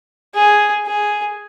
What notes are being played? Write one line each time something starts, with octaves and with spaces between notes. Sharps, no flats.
G#4
G#4